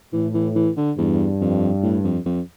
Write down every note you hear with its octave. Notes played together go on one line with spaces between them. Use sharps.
A2 E3
E3
E3
D3
E2 G2
F2
A2
F2
F2